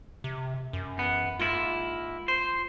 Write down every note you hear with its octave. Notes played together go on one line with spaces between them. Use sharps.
C3
F#2
E2 B3
G#2 A#3 E4 F4
C5